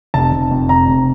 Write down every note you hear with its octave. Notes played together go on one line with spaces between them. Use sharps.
F1 A5
F1
F2
F1 A#5
F1